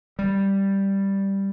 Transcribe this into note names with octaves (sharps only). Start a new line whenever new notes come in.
G3